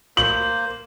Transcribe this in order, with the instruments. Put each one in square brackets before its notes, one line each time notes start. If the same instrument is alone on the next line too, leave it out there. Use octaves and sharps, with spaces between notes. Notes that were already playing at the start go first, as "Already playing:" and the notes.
[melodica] A#3 C5 [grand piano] F#7